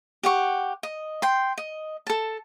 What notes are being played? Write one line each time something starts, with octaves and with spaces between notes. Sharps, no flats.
G4 F#5 C#6
D#5
G5 C6
D#5
A4 A5